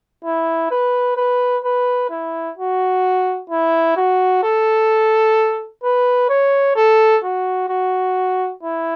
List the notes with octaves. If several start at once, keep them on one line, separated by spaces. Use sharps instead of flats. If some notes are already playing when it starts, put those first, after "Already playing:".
E4
B4
B4
B4
E4
F#4
E4
F#4
A4
B4
C#5
A4
F#4
F#4
E4